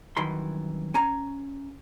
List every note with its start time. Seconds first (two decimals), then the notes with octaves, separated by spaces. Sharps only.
0.17 C2 F#2 D#3 E3 B5 C6
0.94 C#4 G#5 A#5